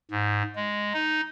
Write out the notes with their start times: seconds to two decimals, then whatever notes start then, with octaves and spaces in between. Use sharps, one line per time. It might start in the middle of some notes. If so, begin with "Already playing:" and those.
0.11 G#2
0.56 G#3
0.94 D#4